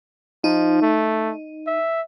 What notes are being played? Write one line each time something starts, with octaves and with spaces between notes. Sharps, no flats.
F3 D#4
A3
E5